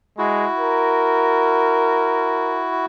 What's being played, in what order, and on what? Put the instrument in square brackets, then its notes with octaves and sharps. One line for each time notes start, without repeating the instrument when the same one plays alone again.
[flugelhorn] G#3 [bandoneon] E4 F#4
[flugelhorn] A#4